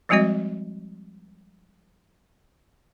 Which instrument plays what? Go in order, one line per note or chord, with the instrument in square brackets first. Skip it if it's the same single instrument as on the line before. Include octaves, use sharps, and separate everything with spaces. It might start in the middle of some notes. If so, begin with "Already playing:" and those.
[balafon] F3 G3 G#3 C4 F#4 D#5